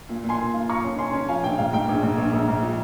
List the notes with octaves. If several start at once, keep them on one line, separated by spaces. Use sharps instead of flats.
A#2
A#2
G#5 C6
A#2
F4
F4 A#5 C#6
C#4
C#4 G#5 C6
C#4
F3 F5 G#5
A#1 G5
G#2 F5
G#2 G5
A#1
G#2
A#1
A#1
G#2
F3